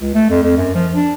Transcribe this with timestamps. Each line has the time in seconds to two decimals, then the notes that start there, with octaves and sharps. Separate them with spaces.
0.01 C#2
0.14 A3
0.30 F2
0.43 F2
0.57 F#2
0.74 F3
0.95 D4